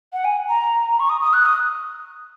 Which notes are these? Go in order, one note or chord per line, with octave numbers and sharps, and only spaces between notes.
F#5
G#5
A#5
C#6
D#6
D#6
F#6
D#6